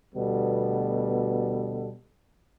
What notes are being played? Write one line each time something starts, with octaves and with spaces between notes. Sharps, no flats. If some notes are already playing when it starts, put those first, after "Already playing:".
D2 B2 G3 B3 A4